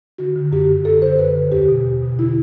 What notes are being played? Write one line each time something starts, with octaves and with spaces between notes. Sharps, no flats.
D3 F#4
D3
F#2 G4
D3
F#2 A4
D3 C5
F#2 B4
D3
E2 G4
B2
E2
B2
D3 E4